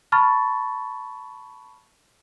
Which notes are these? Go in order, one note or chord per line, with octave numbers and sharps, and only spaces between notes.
A5 B5 C#6 F6 A6